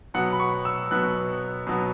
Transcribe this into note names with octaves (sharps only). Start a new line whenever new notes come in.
B2 F#3 B3 F#5
B5
C#6
E6
B2 F#3 B3 F#6
B2 F#3 B3